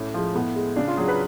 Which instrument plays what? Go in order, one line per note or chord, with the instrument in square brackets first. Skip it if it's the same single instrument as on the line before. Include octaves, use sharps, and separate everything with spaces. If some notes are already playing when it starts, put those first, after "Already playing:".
Already playing: [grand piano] A2 C#4
F3 G#3
A2 B3
G#3
C#3 D4
F4
F#3 G#4
B4